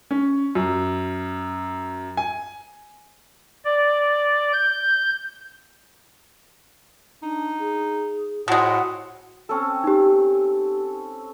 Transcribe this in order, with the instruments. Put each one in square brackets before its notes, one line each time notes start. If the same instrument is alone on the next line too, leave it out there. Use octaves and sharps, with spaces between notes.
[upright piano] C#4
F#2
G#5
[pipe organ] D5
G6
[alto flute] D4 [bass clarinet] D#4
[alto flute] G#4
[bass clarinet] A2 [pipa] F3 G#3 [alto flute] F#4 [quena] F#5
[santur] C4 C#4 A4
[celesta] D#4 G4